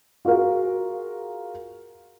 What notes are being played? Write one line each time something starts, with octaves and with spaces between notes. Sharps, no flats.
F4 F#4 G#4 A#4 F5